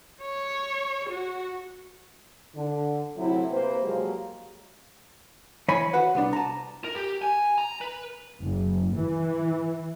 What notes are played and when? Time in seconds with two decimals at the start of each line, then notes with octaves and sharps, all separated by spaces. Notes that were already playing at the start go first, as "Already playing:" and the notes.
0.21 C#5
1.10 F#4
2.55 D3
3.17 A2 C3 F#3 E4
3.51 C3 A#3 B4 C5
3.83 F3 F#3 G#3 A#3 G4
5.68 E3 C#5 G#5 B5
5.93 F#4 B4 F#5
6.15 C2 B3 D4
6.33 A5 A#5
6.84 A#4
6.96 G4
7.22 G#5
7.58 A#5
7.81 B4
8.43 F#1
8.94 E3